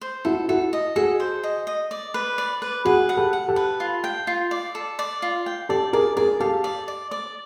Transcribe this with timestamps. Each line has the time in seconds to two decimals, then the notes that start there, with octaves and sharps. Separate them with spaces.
0.01 C5
0.25 E4 F#4 A4
0.48 E4 F#4 A4
0.73 D#5
0.96 F#4 G#4 A4
1.20 C5
1.43 D#5
1.67 D#5
1.91 D5
2.14 B4
2.38 D5
2.62 B4
2.85 F#4 G#4 B4
3.09 F#5
3.17 G4 A4
3.33 F#5
3.48 G4 A4
3.56 B4
3.80 F4
4.04 G5
4.27 F4
4.51 D5
4.75 A4
4.99 D5
5.22 F4
5.46 G5
5.69 G4 A4 D5
5.93 G#4 A#4 D5
6.17 G#4 A#4 D5
6.40 G4 A4 F5
6.64 D5
6.88 D5
7.11 D5